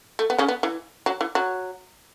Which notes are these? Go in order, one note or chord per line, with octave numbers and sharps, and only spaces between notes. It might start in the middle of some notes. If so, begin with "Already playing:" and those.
A3
B3
C#3 C#4
B3
E3
F#3
E3
F#3